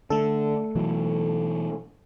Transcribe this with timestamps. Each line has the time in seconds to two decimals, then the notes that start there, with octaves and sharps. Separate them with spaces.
0.10 D3 A3 A4
0.75 B2 E3 F#3